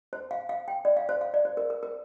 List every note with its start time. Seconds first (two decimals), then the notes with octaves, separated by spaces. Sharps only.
0.13 C5
0.31 F5
0.49 F5
0.68 G5
0.85 D5
0.97 F5
1.09 C5
1.21 F5
1.34 D5
1.45 C5
1.57 A#4
1.70 A#4
1.83 A#4